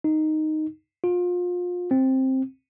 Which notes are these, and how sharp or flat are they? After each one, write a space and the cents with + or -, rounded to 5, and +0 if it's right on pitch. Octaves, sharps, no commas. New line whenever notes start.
D#4 -5
F4 +30
C4 +10